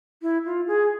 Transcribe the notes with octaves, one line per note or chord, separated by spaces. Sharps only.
E4
F4
G#4